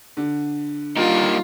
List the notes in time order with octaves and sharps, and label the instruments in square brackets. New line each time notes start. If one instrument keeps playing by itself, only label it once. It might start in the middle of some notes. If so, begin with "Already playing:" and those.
[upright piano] D3
[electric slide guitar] G3 A#3 D#4 [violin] F4